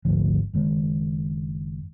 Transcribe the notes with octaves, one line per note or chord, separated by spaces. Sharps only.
G#1 D2 F3
F#1 D#3 G#3